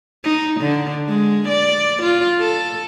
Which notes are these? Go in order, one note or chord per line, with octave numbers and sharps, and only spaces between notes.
D#4
D3
G#3
D5
F4
A4